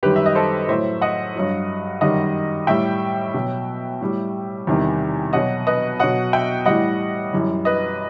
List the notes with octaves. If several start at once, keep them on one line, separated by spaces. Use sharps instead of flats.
F#2 D#3 G3 G4 B4
E5
D#5
A4 C5
A2 F#3 C5 E5
D#5 F#5
G2 F#3
F#2 D#3 G3 D#5 F#5
A2 G3 E5 G5
B2 F#3
A2 G3
E2 C3 D#3 G3
B2 F#3 D#5 F#5
B4 D#5
B2 F#3 D#5 F#5
E5 G5
A2 E3 G3 D#5 F#5
F#2 E3 G3
B4 D#5